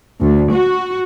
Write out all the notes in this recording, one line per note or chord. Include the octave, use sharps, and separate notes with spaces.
D2
F#4